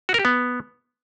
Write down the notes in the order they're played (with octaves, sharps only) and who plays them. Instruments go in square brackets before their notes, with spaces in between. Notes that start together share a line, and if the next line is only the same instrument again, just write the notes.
[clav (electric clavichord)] F#4
A#4
G4
B3